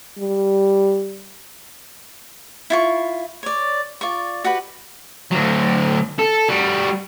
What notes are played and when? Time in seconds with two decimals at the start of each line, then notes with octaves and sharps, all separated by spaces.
0.18 G3
2.70 E4 F4 C#6
3.43 C#5 D5
4.01 F4 D5 C#6
4.44 F#4 G4 B4
5.32 D2 F#3
6.19 A4
6.49 G3 F#4